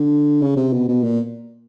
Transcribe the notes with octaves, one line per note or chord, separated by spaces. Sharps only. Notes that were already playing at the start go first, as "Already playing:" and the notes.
Already playing: D3
C#3
C3
B2
B2
A#2